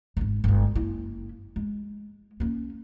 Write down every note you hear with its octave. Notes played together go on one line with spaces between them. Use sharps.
D1 G#1
G1 G#3
F#1 E4
G#3
A#3 C#4